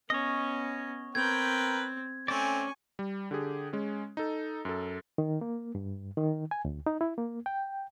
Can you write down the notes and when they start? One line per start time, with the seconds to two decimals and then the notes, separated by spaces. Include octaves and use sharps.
0.10 B3 C#4 C#5 D#5
1.15 C4 A#4 B4 G5 G#6
2.28 A3 C4 C#4 D5 G#5 C#6
2.99 G3
3.31 D3 G4 G#4
3.73 G#3 C#4
4.17 D#4 A4
4.65 F#2 A4
5.18 D#3
5.41 A#3
5.75 G2
6.17 D#3
6.51 G#5
6.65 D2
6.86 D#4
7.01 E4
7.18 A#3
7.46 G5